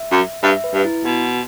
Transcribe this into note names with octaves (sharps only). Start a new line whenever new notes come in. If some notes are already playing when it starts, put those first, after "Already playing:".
Already playing: E5
F#2
G2 E5
B4
G2
E4
B2 F#4